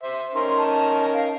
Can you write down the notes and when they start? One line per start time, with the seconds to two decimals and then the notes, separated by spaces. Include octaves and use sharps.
0.03 C5 E5
0.35 C#4 D#4 A#4 C6
0.58 A5
1.13 F5